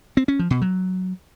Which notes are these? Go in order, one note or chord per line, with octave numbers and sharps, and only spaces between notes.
C4
C#4
F3
B2
F#3